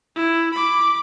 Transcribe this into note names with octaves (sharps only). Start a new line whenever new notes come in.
E4
B5 D6